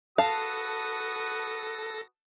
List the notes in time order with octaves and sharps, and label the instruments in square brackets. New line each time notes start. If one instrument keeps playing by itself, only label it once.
[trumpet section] F#4 B4 D#6 [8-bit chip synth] A4 A#6 [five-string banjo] F5 [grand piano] A5